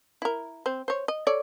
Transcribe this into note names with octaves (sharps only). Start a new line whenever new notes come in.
E4 A#4
C4 C5
C5 C#5
D#5
A4 C#5 D5